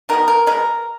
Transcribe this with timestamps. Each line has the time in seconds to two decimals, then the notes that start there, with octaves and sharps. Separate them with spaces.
0.09 D#3 F#3 B3 A#4
0.28 A#4
0.46 B2 G#3 B3 A#4